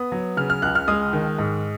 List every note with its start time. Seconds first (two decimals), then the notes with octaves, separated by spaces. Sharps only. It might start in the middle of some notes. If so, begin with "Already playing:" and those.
Already playing: B3 D#6
0.12 F#3
0.37 C#3 F6
0.50 F6
0.62 C#2 F#6
0.75 F6
0.88 G#3 D#6
1.13 D#3
1.39 G#2